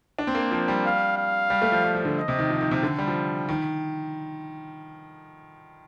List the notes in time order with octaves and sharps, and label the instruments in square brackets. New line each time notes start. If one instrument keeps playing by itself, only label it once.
[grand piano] D4
C4
A#3
F3
G3
[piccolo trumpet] F5
F5
[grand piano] G3
A3
F3
G3
F3
D3
[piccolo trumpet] D#5
[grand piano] C3
D#3
F3
D#3
C3
D3
G3
F3
D#3